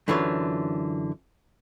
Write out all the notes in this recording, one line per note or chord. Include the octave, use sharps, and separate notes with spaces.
F#2 D3 E3 F4 C#5